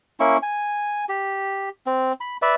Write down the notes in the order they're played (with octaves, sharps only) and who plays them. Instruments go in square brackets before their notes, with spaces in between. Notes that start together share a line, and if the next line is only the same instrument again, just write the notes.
[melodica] A#3 C#4 E4 C#6
G#5
G4
C4
B5
B4 D5 E5